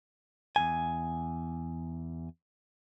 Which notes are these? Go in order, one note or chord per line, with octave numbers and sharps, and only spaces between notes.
E2 G2 G#5